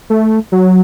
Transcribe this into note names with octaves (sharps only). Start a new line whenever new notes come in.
A3
F#3